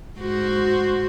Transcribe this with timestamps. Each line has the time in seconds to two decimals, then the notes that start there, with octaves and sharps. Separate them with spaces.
0.18 G#2 F#4 C5